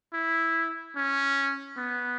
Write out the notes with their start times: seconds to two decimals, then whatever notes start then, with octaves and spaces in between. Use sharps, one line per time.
0.14 E4
0.96 C#4
1.77 B3